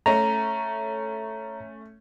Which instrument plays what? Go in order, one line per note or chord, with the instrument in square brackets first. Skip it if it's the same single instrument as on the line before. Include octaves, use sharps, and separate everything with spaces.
[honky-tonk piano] A3 C#4 [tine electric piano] A#5